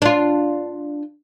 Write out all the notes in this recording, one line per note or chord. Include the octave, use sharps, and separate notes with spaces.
D4 F4